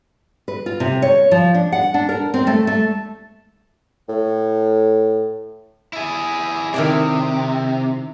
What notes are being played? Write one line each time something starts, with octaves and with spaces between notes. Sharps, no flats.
B4
F4
C3
C#5
F3
D4
F#5
D4
A#4
C4
A3
A3
A2
E4 G#4
C3 D#3 E4 D5